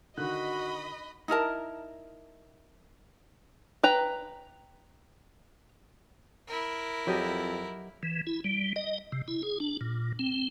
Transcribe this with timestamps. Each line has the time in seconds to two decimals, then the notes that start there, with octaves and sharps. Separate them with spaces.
0.17 D3 D#3 F#4 D#5 B5 F#6
1.28 D#4 E4 A#4 A5
3.83 B4 G5 A#5
6.48 E4 A#4
7.07 F2 F#3 G4 D#5
8.03 E3
8.27 E4
8.44 G3
8.76 D#5
9.12 C3
9.28 E4
9.43 G#4
9.60 D4
9.81 A#2
10.19 C4